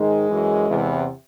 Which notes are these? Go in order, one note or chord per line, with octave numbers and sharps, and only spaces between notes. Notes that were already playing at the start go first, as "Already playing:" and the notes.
Already playing: G#2 D#3 G#3
F#2 E3
E2 C3 E3